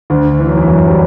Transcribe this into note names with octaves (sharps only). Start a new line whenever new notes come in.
D2 D3
E3
F#3
E2 E3
F#2 F#3
G3